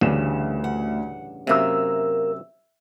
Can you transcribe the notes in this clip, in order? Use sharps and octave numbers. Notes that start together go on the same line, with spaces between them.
A1 D2 G2 C#3 E7
F#5
F#2 C3 A#3 A#4 E5 E6